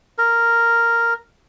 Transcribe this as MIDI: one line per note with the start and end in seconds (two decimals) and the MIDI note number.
0.18 1.14 70